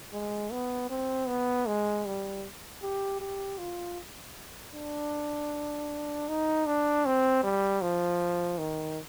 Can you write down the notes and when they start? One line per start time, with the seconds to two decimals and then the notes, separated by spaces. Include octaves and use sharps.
0.13 G#3
0.52 B3
0.90 C4
1.28 B3
1.66 G#3
2.06 G3
2.82 G4
3.20 G4
3.58 F4
4.74 D4
6.28 D#4
6.66 D4
7.06 C4
7.44 G3
7.82 F3
8.58 D#3